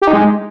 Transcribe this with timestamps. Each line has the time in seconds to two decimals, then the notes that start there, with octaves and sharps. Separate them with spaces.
0.02 G4
0.07 D#4
0.13 G#3